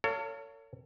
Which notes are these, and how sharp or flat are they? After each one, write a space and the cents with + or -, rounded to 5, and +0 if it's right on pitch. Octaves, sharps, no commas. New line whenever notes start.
A4 +40 C#5 +25 F5 +0